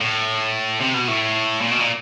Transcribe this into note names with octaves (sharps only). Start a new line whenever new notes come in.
A2
C3
B2
A2
A#2
B2
A#2